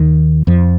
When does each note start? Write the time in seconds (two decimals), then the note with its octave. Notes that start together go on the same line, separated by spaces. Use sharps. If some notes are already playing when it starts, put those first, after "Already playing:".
Already playing: D#2 D#3
0.47 F2 F3